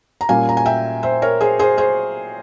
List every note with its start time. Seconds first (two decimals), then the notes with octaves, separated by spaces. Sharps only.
0.21 A#5
0.29 A#2 G3 A#3 C#4 F5 G#5
0.49 A#5
0.57 G#5
0.66 E5 G5
1.03 C5 E5
1.22 A#4 C#5
1.41 G#4 C5
1.59 G#4 C5
1.78 G#4 C5